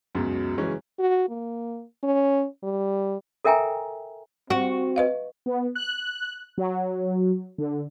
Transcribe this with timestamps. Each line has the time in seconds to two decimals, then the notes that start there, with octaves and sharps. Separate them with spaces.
0.15 C#2 F#2 B2 F#3
0.58 C#3 E3 F#3 G#3 C#4
0.99 F#4
1.29 A#3
2.03 C#4
2.63 G3
3.45 A4 A#4 E5 G5 G#5 A#5
4.50 C4 F#4
4.96 B4 D#5 F5
5.46 B3
5.75 F#6
6.58 F#3
7.58 D3